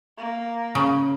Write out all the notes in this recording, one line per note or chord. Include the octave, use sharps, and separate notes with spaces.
A#3
C#3